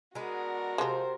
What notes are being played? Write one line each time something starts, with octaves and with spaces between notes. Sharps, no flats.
G#3 B3 D4 F#4 A#4
C3 F3 G#3 C5